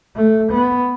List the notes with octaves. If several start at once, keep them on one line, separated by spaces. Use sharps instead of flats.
A3
B3